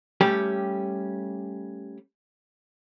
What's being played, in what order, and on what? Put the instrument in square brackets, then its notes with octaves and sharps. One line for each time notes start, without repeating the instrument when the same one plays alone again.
[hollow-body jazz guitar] G3 A3 C#4 G4